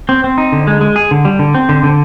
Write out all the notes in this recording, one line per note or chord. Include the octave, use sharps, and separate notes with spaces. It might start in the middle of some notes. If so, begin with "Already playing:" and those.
C4
C4
D#4
D3
G#3
G#3
G#4
D3
G3
D3
C4
D3
D3